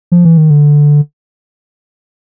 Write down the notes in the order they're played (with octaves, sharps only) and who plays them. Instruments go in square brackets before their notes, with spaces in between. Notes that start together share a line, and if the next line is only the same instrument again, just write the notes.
[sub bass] F3
E3
D#3
D3